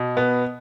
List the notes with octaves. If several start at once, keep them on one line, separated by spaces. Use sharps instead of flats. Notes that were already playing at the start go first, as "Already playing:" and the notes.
Already playing: B2
B3